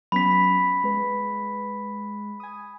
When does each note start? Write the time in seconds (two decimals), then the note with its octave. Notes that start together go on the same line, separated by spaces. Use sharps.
0.12 F#3 B3 C#4 B5 B6
0.84 G#3 B4
2.40 G#5 D#6